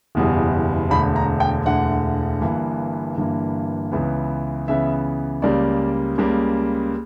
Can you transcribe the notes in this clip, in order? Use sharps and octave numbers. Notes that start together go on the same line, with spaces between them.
F#1 E2 B2 G3
E1 D2 D3 B5
A#5
G5
E1 D2 D3 F#5
G1 G2 E3 A#3
G1 G2 E3 A#3
C#2 C#3 E3 B3
C#2 C#3 E3 B3 E5
C#2 C#3 G3 A#3 D5
C#2 C#3 G3 A#3